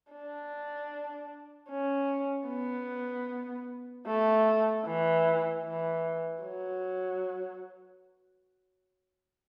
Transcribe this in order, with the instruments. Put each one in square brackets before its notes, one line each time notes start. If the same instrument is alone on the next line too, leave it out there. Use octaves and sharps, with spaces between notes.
[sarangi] D4
C#4
B3
A3
E3
E3
F#3